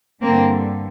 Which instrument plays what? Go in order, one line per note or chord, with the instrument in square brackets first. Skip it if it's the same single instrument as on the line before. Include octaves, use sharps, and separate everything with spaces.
[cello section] G2 D3 A#3 C4